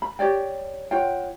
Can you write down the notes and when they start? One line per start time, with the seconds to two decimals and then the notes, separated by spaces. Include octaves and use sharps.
0.02 B5
0.19 G4 C#5 D5 G5
0.91 F4 C#5 F#5 G5